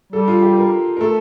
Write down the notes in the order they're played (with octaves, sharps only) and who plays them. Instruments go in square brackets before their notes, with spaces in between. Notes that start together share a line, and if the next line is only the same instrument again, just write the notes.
[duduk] G3 [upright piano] A4
[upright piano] F4
G4
A#4
A#4
[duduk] A3 [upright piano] A4